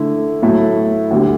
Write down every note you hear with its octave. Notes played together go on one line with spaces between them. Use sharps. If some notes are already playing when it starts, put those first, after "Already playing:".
Already playing: D3 A3 E4
A2 F#3 A3 E4
D2 D3 G3